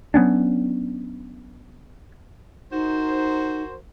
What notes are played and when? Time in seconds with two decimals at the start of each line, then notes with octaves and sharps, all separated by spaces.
0.14 F#3 B3 C#4 D4
2.72 D#4 F#4 A#4 C5